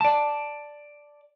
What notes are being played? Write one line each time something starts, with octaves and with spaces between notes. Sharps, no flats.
D5 A5